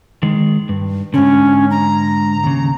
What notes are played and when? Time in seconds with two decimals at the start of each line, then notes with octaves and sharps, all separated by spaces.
0.23 D#3 G#3
0.69 G2
1.14 G#2 D3 C#4
1.71 A#5
2.44 D#2 C#3